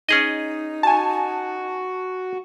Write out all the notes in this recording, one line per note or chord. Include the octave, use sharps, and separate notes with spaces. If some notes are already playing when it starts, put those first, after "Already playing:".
C#4 D#4 G#4 D#5
F#4 G#5 A5